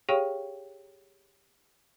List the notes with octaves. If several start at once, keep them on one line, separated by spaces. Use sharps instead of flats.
G4 G#4 C#5 F5 G5 C#6